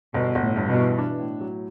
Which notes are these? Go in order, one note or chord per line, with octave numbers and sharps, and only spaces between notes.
G1 B2
G1
A2
G2
B2
E3
D4
A2
F#3